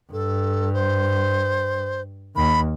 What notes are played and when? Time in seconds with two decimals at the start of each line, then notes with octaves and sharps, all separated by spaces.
0.12 G2 A4
0.73 C5
2.36 D#2 B5